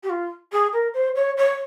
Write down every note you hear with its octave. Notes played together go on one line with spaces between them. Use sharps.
G4
F4
G#4
A#4
C5
C#5
C#5